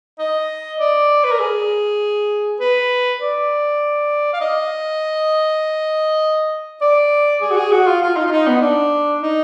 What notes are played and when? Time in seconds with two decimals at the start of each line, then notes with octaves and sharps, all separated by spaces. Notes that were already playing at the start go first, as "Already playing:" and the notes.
0.19 D#5
0.79 D5
1.24 B4
1.32 A#4
1.39 G#4
2.60 B4
3.20 D5
4.33 F5
4.41 D#5
6.81 D5
7.41 G#4
7.51 F#4
7.57 G#4
7.71 F#4
7.87 F4
8.02 F4
8.17 D#4
8.26 F4
8.32 D#4
8.47 B3
8.61 D4
9.22 D#4